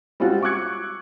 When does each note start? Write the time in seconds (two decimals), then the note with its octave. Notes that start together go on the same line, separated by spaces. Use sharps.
0.20 G3 G#3 C4 C#4 F4 F#4
0.42 C#6 D6 E6 F#6 G#6 C#7